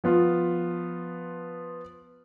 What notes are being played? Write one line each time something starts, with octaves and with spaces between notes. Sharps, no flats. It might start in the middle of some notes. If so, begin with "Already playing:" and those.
F3 B3 F4